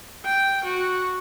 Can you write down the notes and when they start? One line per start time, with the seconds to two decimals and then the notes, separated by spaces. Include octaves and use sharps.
0.25 G5
0.64 F#4